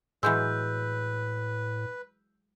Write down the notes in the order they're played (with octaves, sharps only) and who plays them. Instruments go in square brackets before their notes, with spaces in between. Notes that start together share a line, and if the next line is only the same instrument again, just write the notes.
[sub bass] A2 [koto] E3 F#3 G#3 [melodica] B4 [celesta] E6 G6